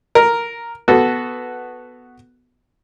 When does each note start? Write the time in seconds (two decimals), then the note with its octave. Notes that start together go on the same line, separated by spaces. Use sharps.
0.15 A#4
0.88 B3 F#4 A4